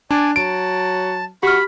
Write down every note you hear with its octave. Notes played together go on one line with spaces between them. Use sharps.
D4 D5 G#5
F#3 A5 D7
F#4 G4 B5 F6